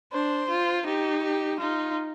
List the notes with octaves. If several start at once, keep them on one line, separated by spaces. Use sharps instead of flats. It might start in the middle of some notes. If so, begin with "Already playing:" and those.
D4 C5
F4
D#4 G4
G4
D#4 F4